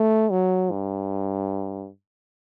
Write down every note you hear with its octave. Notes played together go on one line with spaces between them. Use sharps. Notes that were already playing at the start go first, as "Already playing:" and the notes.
Already playing: A3
F#3
G2